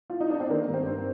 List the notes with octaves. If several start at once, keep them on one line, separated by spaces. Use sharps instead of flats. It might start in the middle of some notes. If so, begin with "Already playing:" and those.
F4
D#4
D4
C4
D#3 A#3
G2
C4
G2